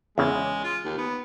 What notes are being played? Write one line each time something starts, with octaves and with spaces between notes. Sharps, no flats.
E2 C#3 G#3
F4
D#2
B3